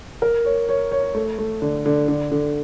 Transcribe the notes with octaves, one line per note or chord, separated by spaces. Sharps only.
A#4
C#5
C#5
C#5
A3
A3
D3
D3
D3
D3